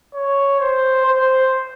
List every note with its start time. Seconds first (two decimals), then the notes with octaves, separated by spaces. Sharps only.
0.14 C#5
0.60 C5
1.05 C5